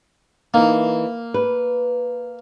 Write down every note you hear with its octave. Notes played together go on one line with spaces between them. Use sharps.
E3 A#3 D#4
B4